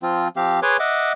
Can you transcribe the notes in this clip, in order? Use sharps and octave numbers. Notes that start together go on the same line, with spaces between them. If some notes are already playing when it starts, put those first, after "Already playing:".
F3 C4 F4
F3 C4 G4 F5
G#4 B4 C#5 G#5 C6 D6
D#5 E5 F#5 D6